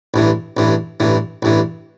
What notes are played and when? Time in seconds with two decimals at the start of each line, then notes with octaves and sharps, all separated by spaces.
0.14 A1 G2 E3
0.57 A1 G2 E3
1.00 A1 G2 E3
1.42 A1 G2 E3